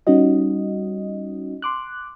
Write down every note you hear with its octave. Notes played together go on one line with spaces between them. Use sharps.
G3 C#4 D#4 F#4 D#5
C6 D6 F#6